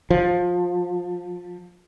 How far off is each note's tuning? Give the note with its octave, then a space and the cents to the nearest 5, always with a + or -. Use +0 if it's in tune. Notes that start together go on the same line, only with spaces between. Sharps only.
F3 +20